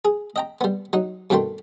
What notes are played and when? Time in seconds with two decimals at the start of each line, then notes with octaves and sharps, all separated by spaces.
0.05 G#4
0.36 D#5 G5 A#5
0.61 G3 B3
0.93 F#3 D#4
1.30 G2 B2 D#3 A3 G5 C6